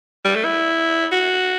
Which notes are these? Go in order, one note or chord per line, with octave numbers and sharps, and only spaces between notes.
G3
A3
E4
F#4